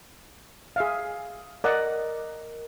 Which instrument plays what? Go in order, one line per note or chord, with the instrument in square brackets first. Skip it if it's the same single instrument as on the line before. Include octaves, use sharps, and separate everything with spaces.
[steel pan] G#4 E5 F5
[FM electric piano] A#4 [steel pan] D5 D#5 F#5